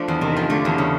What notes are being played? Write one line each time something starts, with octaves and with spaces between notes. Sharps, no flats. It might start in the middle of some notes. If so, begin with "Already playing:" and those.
Already playing: F3 A3 D4
E2
C3 D#3
F3
D3 A3
E2
C#3